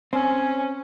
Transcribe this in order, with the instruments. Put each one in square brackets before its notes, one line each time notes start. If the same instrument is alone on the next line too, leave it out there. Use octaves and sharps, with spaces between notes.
[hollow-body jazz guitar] C4 [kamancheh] C#4